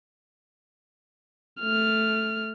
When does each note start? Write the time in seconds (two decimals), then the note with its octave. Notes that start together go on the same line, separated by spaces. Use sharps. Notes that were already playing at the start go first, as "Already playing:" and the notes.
1.60 A3 F6